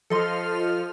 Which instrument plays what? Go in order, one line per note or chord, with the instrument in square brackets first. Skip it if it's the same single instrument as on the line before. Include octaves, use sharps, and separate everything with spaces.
[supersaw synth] F3 F6 [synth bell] A4 D#5 C6